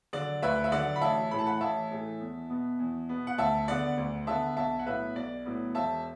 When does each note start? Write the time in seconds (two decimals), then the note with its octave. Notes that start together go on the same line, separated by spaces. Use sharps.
0.13 D3 F#3 D5
0.42 D2 B4 E5
0.64 E5
0.72 D3 F#3 D5 F#5
0.96 B5
1.01 A1 E5 A5
1.31 A2 E3 A3 B5
1.39 A5
1.46 F#5 B5
1.61 A1 E5 A5
1.91 A2 E3 A3
2.20 E2
2.50 B2 B3
2.79 E2
3.09 B2 B3
3.27 F#5
3.38 D2 E5 A5
3.68 D3 B3 D5 F#5
3.98 D2
4.27 D3 B3 E5 A5
4.57 B1 E5 A5
4.79 F#5
4.86 A2 F#3 B3 B4 E5
5.16 B1 D5
5.45 A2 F#3 B3
5.75 E1 E5 A5